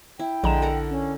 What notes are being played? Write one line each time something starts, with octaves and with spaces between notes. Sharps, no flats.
E4 G5
A#1 D3 G#3 A#5 E7
A4 A#4 F#5
C#4